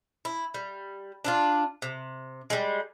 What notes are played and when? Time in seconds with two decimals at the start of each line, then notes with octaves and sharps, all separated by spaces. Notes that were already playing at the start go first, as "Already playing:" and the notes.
0.25 E4
0.54 G3
1.24 D4 E4 F4
1.82 C3
2.50 G3 G#3